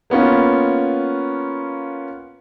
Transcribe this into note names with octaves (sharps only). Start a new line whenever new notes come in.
A#3 B3 C#4 F4